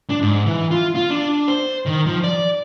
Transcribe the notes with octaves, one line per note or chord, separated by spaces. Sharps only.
D4
G#2
E3
F4
F4
D4
C5
D#3
F3
D5